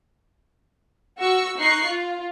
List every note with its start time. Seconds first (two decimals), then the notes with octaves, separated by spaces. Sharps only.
1.19 F#4 C#6 E6
1.59 D#4 C#6 F#6 C7
1.87 F4